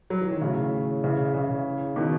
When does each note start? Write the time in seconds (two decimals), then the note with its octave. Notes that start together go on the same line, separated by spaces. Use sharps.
0.10 F#3
0.21 E3
0.31 D#3
0.41 A2 C#3
1.03 C#3 E3
1.34 C#3 E3
1.96 B2 D#3